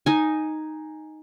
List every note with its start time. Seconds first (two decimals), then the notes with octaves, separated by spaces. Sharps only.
0.06 D#4 G#5